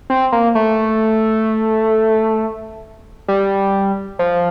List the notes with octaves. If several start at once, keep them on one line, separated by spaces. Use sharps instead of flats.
C4
A#3
A3
G3
F3